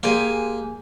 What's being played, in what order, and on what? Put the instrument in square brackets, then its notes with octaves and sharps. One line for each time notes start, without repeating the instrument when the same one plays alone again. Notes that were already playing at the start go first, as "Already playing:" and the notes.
[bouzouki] G#3 G4 G#5 [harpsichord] A#3